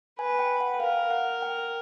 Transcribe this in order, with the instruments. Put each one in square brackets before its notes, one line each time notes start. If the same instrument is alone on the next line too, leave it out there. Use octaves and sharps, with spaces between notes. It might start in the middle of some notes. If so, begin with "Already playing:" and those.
[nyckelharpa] B4 [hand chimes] G#5
[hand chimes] G5
F#5
[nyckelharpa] A#4 [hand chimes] F5
[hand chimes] F#5
G5